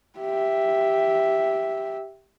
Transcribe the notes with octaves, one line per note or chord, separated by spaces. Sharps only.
G4 E5